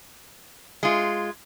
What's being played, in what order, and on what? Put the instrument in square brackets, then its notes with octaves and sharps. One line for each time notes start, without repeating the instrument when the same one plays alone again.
[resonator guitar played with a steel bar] G#3 F4